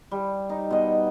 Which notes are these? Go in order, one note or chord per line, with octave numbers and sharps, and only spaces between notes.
G3
D#4
B2 D#5